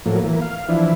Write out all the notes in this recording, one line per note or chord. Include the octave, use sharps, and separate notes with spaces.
A2 F3 F#3 A#3
E3 A#3
F5
E3 F3 D4 E4